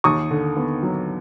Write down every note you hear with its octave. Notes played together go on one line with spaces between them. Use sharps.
D#2 C#6 D#6
D3
B3
F#3